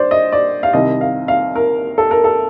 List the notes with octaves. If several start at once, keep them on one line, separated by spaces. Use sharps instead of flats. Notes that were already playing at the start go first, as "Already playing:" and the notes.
Already playing: G2 C5 D5
D#5
D5
F5
C2 C3 D#3 D#5
F5
F5
A#4
A4
A#4
A4